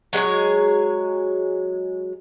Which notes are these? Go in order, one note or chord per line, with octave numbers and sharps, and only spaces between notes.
F#3 G#3 G#4 C#5